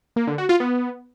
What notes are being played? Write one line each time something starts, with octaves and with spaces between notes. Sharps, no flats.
A#3
D3
F#4
F4
B3